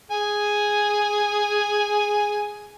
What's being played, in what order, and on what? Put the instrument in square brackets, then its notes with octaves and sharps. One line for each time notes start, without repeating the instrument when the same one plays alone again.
[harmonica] G#4 G#5